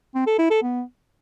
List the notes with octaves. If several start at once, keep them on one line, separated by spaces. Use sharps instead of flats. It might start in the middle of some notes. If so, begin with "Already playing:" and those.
C4
A4
E4
A4
B3